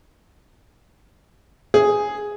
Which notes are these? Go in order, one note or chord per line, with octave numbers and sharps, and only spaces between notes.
G#4